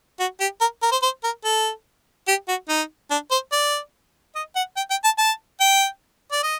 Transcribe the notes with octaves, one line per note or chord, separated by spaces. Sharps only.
F#4
G4
A#4
A#4
C5
C5
A#4
A4
G4
F#4
D#4
D4
C5
D5
D#5
F#5
G5
G5
A5
A5
G5
D5
D#5